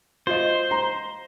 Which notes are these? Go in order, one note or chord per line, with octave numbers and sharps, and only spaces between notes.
F4 C5 D#5
A#5